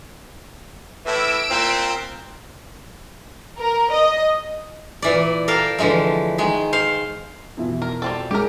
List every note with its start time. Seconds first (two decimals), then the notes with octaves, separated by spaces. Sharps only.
1.05 A2 E3 E4 E6 D7
1.49 A#2 C4
3.58 A#4
3.91 D#5
5.02 A#2 E3 D5
5.48 A4 A#4 F5 G5
5.79 D3 E3 F3 G#3 A3
6.38 D#3 G#3
6.73 C5 F5
7.57 F2 B2 E3
7.82 A#4
8.02 G3 C4 A4
8.31 G#3 C#4 G4 G#4 A#4 F6 D7